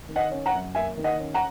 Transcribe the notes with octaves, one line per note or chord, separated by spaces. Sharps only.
D#3
D#5 F#5
C#4
F#5 A#5
F#2
A#3 E5 G#5
D#3
D#5 F#5
C#4
F#5 A#5